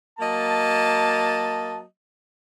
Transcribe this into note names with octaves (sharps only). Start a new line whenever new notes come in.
F#3 A#3 D#5 A5